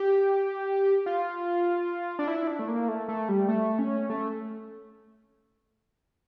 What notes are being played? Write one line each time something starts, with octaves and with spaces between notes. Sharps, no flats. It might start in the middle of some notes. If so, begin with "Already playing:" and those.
Already playing: G4
F4
D4
E4
D4
A3
A#3
A3
A3
G3
A3
C#4
A3